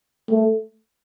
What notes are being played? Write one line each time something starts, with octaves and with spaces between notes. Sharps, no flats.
A3